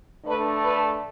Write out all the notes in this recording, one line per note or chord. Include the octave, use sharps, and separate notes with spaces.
D3 A3 D4 B4
B4